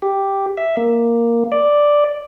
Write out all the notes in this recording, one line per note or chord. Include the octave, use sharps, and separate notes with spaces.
G4
E5
A#3
D5